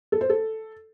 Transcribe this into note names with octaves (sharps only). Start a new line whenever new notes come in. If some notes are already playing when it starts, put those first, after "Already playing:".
A4
C5
A4